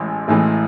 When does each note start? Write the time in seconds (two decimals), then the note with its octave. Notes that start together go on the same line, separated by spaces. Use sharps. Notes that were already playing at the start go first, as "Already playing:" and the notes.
Already playing: A1 A2 E3 G#3
0.28 A1 A2 E3 G#3